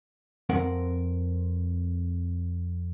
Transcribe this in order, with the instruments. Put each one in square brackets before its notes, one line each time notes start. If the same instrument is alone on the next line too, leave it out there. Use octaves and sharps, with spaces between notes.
[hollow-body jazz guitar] F2 C4 A#4 F#5